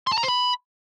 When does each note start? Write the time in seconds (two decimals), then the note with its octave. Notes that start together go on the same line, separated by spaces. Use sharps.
0.07 C6
0.12 A5
0.18 A#5
0.23 C5
0.28 B5